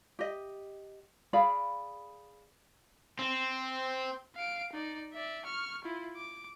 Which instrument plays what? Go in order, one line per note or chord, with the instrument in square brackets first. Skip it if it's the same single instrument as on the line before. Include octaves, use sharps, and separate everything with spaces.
[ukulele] G4 D#5
G#4 D5 F5 B5
[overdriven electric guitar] C4
[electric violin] F5 D7
D#4 D5
D5 E5
C#6 F6
E4 F4
D6